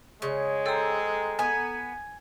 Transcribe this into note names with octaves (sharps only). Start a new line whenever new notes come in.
C#3 G#3 C#6
C4 A4 A#5
B3 G#5